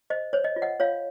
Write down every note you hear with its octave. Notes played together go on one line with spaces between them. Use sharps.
C5 D#5
C5 C#5
D#5
F4
D#5 F#5
F4 C#5 F5